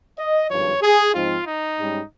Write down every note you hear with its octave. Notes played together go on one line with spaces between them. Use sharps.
D#5
G#1 G2 F3 C#5
G#4
G#2 F3 C4 D#4 F4
D#4
G#2 G3 C#4